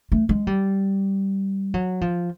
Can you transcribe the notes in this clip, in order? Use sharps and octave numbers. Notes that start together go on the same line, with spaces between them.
A3
G#3
G3
F#3
F3